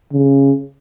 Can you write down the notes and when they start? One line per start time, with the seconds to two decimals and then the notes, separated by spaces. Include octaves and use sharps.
0.13 C#3